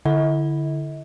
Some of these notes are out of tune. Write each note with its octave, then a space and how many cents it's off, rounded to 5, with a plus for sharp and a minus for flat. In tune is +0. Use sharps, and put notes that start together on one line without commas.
D3 +0 E4 +0 D#5 +45